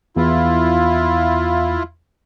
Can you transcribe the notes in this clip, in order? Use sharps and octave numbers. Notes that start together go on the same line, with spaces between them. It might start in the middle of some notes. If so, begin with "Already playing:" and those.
E2 E4 F4